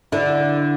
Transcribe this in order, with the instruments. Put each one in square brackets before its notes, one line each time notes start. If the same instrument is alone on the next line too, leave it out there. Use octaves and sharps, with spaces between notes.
[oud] D3 [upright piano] E4